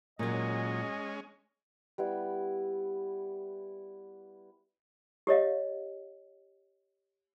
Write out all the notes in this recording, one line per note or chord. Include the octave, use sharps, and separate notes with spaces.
A#2 F#3 G#3 C#4 D#5
G3 B3 E4
G4 C#5 D#5 F5